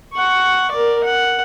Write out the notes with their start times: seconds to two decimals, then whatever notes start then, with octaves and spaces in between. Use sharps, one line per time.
0.14 F#5 C#6
0.71 A#4 D5
1.04 F#5